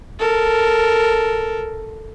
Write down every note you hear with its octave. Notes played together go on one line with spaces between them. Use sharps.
A4 A#4